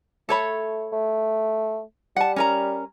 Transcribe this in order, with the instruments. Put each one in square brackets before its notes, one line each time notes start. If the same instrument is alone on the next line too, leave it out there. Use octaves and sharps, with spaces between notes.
[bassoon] A3 [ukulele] A4 C#5 B5
[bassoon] A3
[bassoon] G3 [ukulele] F#5 A5
[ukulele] C#4 A#4 A#5